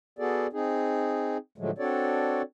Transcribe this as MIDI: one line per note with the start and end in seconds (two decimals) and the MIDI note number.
0.19 0.47 59
0.19 0.47 66
0.19 0.47 68
0.19 0.47 69
0.19 0.47 74
0.53 1.37 60
0.53 1.37 63
0.53 1.37 68
1.58 1.71 45
1.58 1.71 50
1.58 1.71 53
1.58 1.71 54
1.58 1.71 56
1.58 1.71 57
1.78 2.42 60
1.78 2.42 62
1.78 2.42 66
1.78 2.42 69
1.78 2.42 73
1.78 2.42 74